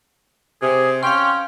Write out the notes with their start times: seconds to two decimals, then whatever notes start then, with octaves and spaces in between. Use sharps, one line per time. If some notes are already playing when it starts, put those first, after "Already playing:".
0.62 C3 G#4
1.03 C#4 F5 G5 C6